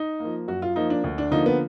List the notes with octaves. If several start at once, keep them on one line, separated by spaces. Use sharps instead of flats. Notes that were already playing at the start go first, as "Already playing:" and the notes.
Already playing: D#4
F3 A#3
F#2 F#4
F4
F3 A#3 D#4
D4
D2
D4
D3 F3 A#3 D#4
B3